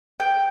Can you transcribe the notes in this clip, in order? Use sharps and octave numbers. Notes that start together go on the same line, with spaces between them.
G5